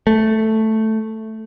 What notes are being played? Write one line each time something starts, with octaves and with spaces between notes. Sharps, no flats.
A3